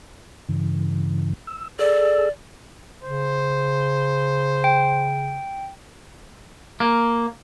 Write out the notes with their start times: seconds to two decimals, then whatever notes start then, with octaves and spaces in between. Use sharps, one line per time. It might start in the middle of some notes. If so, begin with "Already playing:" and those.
0.49 G2 C#3 E3
1.47 E6
1.79 G#4 A4 D5 E6
3.03 C#3 C5
4.64 G5
6.80 A#3